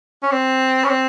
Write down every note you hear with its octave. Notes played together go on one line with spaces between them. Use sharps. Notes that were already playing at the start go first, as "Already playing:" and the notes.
C#4
C4
C#4
C4